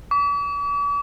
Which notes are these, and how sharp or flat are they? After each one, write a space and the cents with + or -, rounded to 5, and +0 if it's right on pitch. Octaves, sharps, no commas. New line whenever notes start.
D6 -45